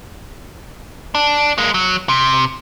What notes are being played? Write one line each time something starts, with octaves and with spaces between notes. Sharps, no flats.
D4
G#3 A#3
F#3
C3